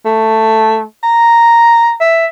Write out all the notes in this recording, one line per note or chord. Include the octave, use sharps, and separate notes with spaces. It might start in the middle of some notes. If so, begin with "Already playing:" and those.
A3
A#5
E5